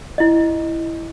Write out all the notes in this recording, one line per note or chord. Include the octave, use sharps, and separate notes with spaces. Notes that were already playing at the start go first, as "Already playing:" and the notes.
E4 D#5